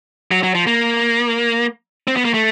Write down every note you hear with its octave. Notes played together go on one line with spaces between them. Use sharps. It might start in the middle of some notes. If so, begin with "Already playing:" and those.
F#3
F#3
F3
A#3
C4
B3
A#3
A3